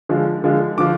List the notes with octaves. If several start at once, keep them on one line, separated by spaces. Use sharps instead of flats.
D3 F3 G#3
D3 F3 G#3
D3 F3 D6